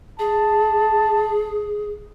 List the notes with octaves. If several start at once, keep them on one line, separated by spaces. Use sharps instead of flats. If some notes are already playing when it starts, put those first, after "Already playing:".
G#4 A5